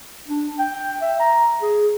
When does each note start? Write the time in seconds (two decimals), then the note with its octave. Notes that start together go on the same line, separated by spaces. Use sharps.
0.28 D4
0.59 G5
1.02 E5
1.20 A#5
1.62 G#4